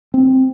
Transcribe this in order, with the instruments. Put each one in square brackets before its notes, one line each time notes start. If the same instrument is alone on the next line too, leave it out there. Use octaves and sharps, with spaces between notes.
[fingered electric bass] C4